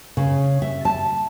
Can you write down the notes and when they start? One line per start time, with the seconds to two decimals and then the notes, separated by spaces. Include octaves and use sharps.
0.17 C#3
0.62 E5
0.85 A5